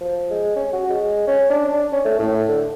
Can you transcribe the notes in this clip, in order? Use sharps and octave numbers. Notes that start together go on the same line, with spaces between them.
F3
G#3
C#4
F#4
G#3
C#4
D4
D4
C#4
A3
A2
D3